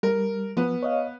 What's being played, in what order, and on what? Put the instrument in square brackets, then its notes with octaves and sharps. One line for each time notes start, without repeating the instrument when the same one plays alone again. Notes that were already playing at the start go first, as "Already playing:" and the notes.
[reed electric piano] G3 [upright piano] A#4
[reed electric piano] F3 [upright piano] B3
[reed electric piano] C#5 D#5 F5